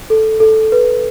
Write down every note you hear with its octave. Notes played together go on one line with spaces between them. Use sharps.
A4
A4
B4